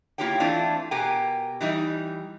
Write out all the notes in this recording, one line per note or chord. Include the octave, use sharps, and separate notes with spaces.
A#3 E4 F4 G4 C#5 G5
E3 A3 C4 D4 E4 F4
B2 G4 A#4 G5 G#5
E3 G3 D#4